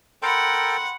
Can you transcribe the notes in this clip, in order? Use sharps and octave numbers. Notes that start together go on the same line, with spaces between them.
A4 A#4 F#5 G5 B5 C6